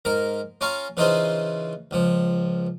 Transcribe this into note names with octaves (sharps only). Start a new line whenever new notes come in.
G#2 A#4 A#5
C#4 F4 F5 A#5 C#6
C#3 E3 D#4 F4 G#4 C5
C#2 F3